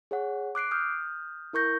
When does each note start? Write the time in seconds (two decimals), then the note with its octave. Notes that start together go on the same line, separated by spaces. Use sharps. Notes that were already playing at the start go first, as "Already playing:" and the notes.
0.11 G#4 C#5 F#5
0.55 D6 F#6 C7 D7
0.71 D#6 F6 G6
1.53 E4 A#4 C#6 G6 A#6